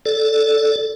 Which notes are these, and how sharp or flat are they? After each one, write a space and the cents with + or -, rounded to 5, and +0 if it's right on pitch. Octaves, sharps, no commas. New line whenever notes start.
A4 +0 D5 +0